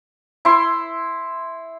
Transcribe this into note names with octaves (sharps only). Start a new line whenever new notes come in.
E4 C6